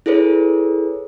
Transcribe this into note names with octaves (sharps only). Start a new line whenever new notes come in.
E4 G#4 A4 B4 C#5